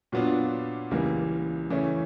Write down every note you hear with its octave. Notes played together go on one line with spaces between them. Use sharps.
A#2 F#3 B3 D4 F4
C#2 C#3 E3 G3 A#3
C#3 E3 A3 C#4